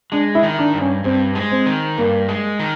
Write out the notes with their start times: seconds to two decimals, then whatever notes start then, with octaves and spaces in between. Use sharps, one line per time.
0.12 G#3 D4
0.35 E4
0.43 D#3
0.59 D4
0.74 G2
0.81 C#4
1.04 G2 C4
1.35 G#3
1.51 C4
1.66 D#3
1.98 G2 A#3
2.29 G#3
2.59 D#3